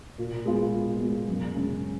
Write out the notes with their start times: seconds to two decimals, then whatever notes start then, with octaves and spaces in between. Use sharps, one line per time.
0.18 A#2
0.46 G#3 B3 F4
0.73 A#2
1.01 G#3 B3 F4
1.28 F#2
1.55 C#3 G#3 C#4